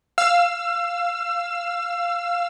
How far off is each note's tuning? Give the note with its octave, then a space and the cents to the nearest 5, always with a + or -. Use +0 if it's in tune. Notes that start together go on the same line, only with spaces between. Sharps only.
F5 +0 E6 +30